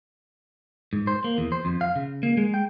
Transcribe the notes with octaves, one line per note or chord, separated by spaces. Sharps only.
G#2
C5
A#3
E2
C5
F2
F5
C#3
A#3
G#3
G5